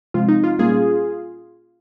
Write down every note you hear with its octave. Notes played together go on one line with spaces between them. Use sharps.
C3 F3 G#3 C4 F4
D#4
F4
A#2 G3 A#3 C#4 F4 G#4